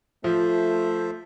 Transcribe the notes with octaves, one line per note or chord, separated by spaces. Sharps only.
F3 A3 C5 E5